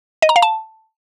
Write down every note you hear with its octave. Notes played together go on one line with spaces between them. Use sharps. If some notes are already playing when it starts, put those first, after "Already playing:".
D#5
A#5
F5
A5